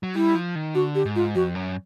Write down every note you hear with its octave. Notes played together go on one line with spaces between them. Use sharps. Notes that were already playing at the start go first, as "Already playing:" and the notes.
F#3
G3 E4
F3
D#3
D3 F#4
G4
G#2
F4
F2 F#4
F#2